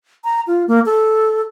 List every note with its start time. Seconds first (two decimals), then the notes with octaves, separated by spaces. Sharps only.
0.24 A#5
0.47 F4
0.68 A#3
0.86 A4